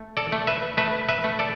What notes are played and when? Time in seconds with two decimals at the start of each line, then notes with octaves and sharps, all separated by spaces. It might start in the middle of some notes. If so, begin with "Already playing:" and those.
Already playing: A3
0.17 A4 D5
0.32 A3
0.47 B4 E5
0.77 A3 B4 E5
1.09 B4 E5
1.24 A3
1.39 A4 D5